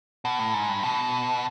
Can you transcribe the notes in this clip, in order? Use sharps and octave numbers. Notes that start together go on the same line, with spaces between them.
B2
A2
G#2
G2
B2